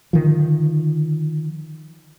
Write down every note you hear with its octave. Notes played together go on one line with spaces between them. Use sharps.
D3 D#3 F3